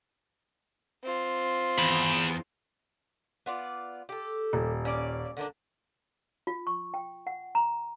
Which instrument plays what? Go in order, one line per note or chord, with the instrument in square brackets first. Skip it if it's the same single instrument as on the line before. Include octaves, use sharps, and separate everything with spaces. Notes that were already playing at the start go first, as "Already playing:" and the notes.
[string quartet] C4 F4
[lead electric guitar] E2 [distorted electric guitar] G#4 B5
[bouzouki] B3 F4 D5
G4 A4
[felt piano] D#1
[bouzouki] C#4 D5 F5
D3 D#3 D4
[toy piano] F4
C#6
G5
F#5
A#5